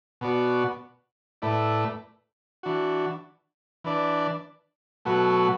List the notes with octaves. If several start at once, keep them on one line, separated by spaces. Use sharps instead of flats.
B2 B3 F#4 D5
A2 A3 E4 B4 D5
E3 D4 F#4
E3 D4 B4 D5
B2 F#3 A3 F#4 B4